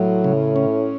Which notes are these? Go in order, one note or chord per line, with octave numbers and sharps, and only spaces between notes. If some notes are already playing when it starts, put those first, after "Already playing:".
Already playing: A2 F#3
C#3
C#4